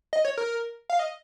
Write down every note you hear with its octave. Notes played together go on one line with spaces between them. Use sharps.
D#5
C#5
A#4
F5
D#5